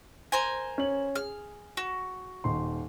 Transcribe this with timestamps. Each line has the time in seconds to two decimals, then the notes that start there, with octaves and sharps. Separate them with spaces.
0.32 A#4 C5 G#5
0.78 C#4 F#7
1.15 G#4 F6
1.77 F#4
2.44 D#1 D#4 C6